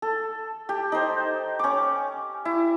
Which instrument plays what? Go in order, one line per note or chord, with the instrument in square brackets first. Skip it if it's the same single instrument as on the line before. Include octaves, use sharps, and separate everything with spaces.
[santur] A4
G4
D#4 C5
C#4 D6
E4